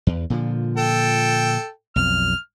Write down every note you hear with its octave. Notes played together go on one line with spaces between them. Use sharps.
E2
A#2 D3 F3
A4 G5
B1 F2 F6